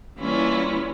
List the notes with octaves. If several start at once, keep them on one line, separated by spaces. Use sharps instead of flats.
E3 G3 A#3 C#4 E4 F4